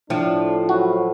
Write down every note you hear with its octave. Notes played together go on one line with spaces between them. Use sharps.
A2 F3 A3 D4
F#3 E4 F#4